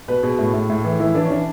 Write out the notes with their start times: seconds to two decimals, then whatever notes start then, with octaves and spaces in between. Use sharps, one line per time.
0.08 B2 B4
0.23 B2 G#4
0.39 A2
0.54 A2
0.70 A2
0.85 E3
1.00 E3 E4
1.15 E3 D4
1.25 C#4
1.31 E3 D4